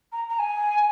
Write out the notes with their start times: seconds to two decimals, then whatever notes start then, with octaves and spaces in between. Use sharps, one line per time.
0.12 A#5
0.29 A#5
0.38 G#5